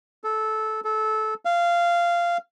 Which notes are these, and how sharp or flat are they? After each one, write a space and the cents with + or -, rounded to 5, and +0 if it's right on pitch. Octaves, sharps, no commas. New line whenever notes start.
A4 -15
A4 -20
F5 -15